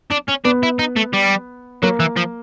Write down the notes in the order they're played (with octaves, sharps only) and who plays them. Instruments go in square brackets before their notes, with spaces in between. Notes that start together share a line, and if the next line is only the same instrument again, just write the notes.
[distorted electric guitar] D4
C#4
[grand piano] B3 [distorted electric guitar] D4
[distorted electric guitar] E4
D#4
A3
G3
[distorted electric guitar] F#3 [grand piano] A#3
[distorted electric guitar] E3
F3